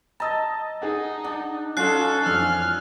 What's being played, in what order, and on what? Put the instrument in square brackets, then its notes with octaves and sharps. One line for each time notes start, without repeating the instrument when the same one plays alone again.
[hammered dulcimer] D#5 A5 [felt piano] A#5 E6 A6
[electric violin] D#4 [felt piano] G#4 F#5
[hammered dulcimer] D4 [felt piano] F#5
[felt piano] F#3 [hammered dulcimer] C#4 F4 [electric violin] D#4 A4 [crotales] F#6 C7
[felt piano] F2 E3 D4 [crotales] E6 [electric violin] F6